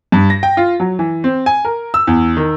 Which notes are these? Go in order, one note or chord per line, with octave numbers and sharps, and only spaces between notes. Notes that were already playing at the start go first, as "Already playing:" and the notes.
G2
A#6
G5
F4
F#3
E3
C4
G#5
A#4
E6
E2
D#3